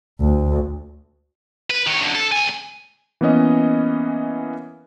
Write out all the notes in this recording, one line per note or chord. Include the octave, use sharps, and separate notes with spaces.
D2
B4
D#3 C#5
F#2 D3
A4
C#2 G#5
E3 A#3 B3 C#4 D#5